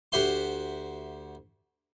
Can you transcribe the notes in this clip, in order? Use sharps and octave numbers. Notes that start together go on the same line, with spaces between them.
D2 F#4 G4 C5 E5 C6